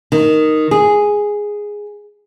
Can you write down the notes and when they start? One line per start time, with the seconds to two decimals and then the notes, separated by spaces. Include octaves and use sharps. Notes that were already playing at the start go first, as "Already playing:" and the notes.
0.12 D#3
0.71 G#4